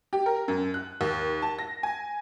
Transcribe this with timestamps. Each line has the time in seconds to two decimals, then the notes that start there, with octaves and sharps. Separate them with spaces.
0.13 G4
0.26 A#4
0.48 F#2
0.74 F#6
1.01 D#2
1.42 A5
1.59 A#6
1.83 G#5